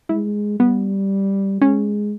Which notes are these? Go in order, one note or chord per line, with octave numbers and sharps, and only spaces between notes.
G#3 E4
G3 B3
G#3 C#4